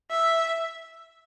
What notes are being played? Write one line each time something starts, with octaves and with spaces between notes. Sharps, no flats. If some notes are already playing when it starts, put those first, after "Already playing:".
E5